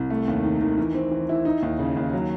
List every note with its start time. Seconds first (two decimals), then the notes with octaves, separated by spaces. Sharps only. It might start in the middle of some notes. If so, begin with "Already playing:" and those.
Already playing: C2
0.10 A3
0.28 D#2
0.43 D#3
0.61 D#3
0.77 E3
0.94 C4
1.11 E3
1.29 E4
1.45 D#4
1.62 D#2
1.79 C#3
1.96 D#2
2.13 F#3